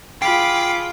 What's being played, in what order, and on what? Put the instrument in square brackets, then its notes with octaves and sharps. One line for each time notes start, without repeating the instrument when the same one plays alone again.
[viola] F4 G#4 [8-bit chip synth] G5 C7 [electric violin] B5 D6